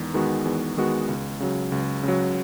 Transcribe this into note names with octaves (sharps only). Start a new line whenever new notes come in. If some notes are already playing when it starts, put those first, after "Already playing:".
Already playing: E2 D#3 G#3 B3
D#3 G#3 B3 F#4
E2
D#3 G#3 B3 F#4
C#2
C#3 F#3
C#2
C#3 F#3